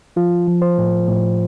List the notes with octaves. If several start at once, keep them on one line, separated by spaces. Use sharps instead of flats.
F3 F4
F3
C5
A2
A2